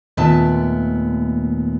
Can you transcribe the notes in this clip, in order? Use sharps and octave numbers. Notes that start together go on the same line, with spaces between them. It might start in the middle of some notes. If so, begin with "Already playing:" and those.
D#2 A#2 A3 B3 E5 A5